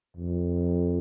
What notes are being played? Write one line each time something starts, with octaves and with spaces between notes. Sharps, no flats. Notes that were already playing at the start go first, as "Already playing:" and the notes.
F2